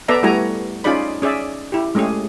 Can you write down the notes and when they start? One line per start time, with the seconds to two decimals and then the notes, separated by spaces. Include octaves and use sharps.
0.08 B3 A4 B4 D5 E5 A#5
0.23 G3 A3 E4 F#4 G#5 A#5
0.84 C#4 D#4 F4 G#4 D5 B5
1.22 C#4 G#4 D5 E5
1.72 E4 G4
1.95 G#3 A3 C#4 G4 G#4